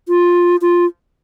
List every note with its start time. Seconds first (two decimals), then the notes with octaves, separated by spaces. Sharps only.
0.09 F4
0.62 F4